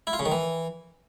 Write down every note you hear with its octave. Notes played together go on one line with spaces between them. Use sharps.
E4
F4
C#3
D#3
E3